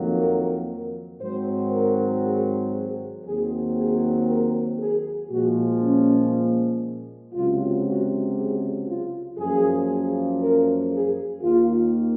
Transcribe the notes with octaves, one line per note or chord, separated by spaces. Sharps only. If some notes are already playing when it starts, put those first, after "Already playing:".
Already playing: F2 D#3 F#3 A#3
A#4
G#2 D#3 F#3 C4 C5
A#4
G#4
G#4
D#2 D#3 F#3 C4 G#4
G#4
A#4
G#4
A#2 F3 G#3 F#4
C#4
C#2 C3 F#3 F4
F#4
G#4
F4
F#2 F3 A#3 G#4
A#4
G#4
D#2 D#3 A#3 F4